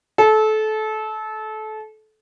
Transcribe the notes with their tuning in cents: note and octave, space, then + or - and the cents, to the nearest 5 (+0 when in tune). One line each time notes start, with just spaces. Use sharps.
A4 -25